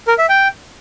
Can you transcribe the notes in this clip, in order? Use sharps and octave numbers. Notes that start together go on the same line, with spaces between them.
A#4
E5
G5